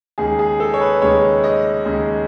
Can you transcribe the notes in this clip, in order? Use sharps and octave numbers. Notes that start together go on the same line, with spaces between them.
D#2 C#3 G#3 G#4
G#4
A4
C#5
B4
D#2 C#3 G#3 C#5
D#5
D#2 C#3 G#3